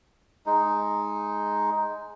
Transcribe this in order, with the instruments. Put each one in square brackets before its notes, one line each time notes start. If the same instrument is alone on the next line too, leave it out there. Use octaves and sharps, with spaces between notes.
[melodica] G#3 D#4